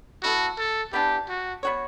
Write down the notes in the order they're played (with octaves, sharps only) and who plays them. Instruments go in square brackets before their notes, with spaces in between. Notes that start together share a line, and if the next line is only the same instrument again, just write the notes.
[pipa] B3 E4 A4 [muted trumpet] F#4
[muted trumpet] A4
[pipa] E3 B3 D4 [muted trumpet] G4
[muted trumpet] F#4
[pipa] B3 F#4 C#5